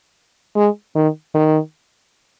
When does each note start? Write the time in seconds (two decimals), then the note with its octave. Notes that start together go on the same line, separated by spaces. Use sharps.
0.56 G#3
0.96 D#3
1.34 D#3